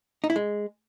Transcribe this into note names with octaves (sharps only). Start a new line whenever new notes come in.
D#4
E4
G#3